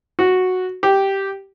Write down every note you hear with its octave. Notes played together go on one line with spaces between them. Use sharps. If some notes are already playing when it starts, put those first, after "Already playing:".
F#4
G4